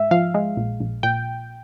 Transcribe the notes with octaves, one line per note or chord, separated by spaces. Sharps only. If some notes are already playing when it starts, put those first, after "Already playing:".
Already playing: G#2 E5
F3 F5
G#3
A#1
A#1
A#2 G5